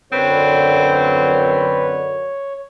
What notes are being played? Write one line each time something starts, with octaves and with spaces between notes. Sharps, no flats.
F#2 D3 C4 B4 C#5